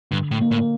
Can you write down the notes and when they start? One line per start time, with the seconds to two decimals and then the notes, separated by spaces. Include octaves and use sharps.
0.11 G2 D3
0.31 A2
0.41 A#3
0.51 A2